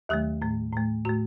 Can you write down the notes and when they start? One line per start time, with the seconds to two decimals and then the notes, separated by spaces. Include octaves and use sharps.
0.09 D#2 D#3 F#3 A3 G4
0.42 A2 A3
0.73 A2 A3
1.05 A2 A3 F#4